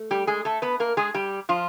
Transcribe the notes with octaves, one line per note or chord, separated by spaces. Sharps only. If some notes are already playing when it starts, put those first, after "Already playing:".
Already playing: A3
G3 G4
G#3 G#4
A3 A4
B3 B4
A#3 A#4
G#3 G#4
G3 G4
F3 F4